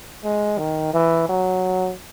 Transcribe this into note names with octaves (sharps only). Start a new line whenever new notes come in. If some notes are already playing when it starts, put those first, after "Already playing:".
G#3
D#3
E3
F#3